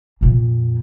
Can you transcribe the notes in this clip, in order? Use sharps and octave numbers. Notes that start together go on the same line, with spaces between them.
F2 A#2